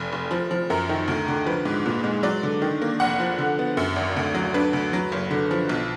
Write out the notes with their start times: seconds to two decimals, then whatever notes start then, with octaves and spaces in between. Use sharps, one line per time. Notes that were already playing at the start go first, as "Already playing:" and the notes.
Already playing: F1
0.12 F1
0.31 F3
0.51 F3
0.70 F#2 A#4
0.89 D#3
1.08 D2
1.28 D3
1.46 F3 B4
1.65 G#2
1.86 A#2
2.04 G#3
2.23 F#3 D5
2.43 D3
2.62 D#3
2.82 A#3
3.00 F1 F#5
3.20 F3
3.38 D3
3.59 B3
3.77 F#2
3.96 G#1
4.16 D2
4.34 F#3
4.54 D4 B4
4.73 D2
4.93 F#3
5.12 F#1
5.31 D3
5.51 F3
5.69 B1